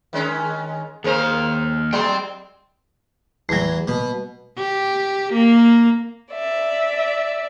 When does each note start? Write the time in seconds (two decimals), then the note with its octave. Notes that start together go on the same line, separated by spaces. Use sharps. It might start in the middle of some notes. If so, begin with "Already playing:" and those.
0.13 D#3 G#3 C#4
1.04 D#2 G#4 A#4 C5 F5
1.93 F#3 G#3 D5 G5 C6
3.49 E2 F#3 G3 A3
3.88 B2
4.59 G4
5.34 A#3
6.32 D5 E5